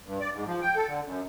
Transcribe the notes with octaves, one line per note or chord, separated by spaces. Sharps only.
G2
D5
G#2
F3
G5
A4
D3
F#2